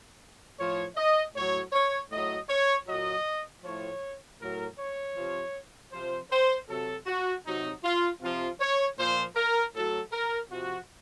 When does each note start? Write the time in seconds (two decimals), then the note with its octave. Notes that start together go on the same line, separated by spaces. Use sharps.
0.58 A2 F3 C#5
0.96 D#5
1.34 A2 F#3 C#5
1.72 C#5
2.11 A2 F#3 D#5
2.49 C#5
2.87 A#2 F#3 D#5
3.63 A2 F3 C#5
4.40 A2 F#3 A#4
4.78 C#5
5.16 C3 F3
5.92 C3 F3 C5
6.30 C5
6.68 C3 F#3 A4
7.06 F#4
7.45 C3 F#3 D#4
7.83 F4
8.21 C3 F3 F4
8.60 C#5
8.97 A#2 F3 C5
9.36 A#4
9.74 A2 F#3 A4
10.12 A#4
10.50 C3 F3 F#4